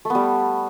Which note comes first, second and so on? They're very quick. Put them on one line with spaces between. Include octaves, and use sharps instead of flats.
A3 B3 G3